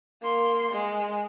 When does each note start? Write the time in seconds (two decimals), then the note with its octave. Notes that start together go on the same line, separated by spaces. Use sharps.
0.22 A#3 C6
0.72 G#3